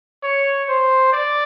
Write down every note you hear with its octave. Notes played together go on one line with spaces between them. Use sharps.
C#5
C5
D5